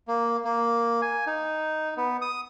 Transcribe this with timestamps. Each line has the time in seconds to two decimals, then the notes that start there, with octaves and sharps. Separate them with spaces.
0.08 A#3
0.45 A#3
1.02 G#5
1.27 D#4
1.97 B3
2.22 D#6